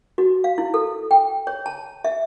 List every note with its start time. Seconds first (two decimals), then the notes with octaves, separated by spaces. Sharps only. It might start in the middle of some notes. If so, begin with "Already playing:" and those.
0.18 F#4
0.44 F5
0.58 E4
0.74 A4
1.11 G5
1.47 C#5
1.66 A5
2.04 E5